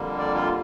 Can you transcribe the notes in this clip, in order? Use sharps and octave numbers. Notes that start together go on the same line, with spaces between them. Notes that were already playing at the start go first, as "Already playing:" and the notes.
Already playing: F2 D3 G3 A#3
D5
F4